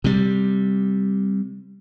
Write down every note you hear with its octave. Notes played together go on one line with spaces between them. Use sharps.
C3 G3